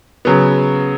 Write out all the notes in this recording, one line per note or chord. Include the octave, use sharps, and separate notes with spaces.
C#3 F#3 B3